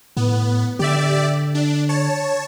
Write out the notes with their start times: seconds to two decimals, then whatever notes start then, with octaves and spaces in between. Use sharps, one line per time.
0.17 A2 B3
0.79 D3 G4 D5 E5
1.55 D4
1.89 C#5 A5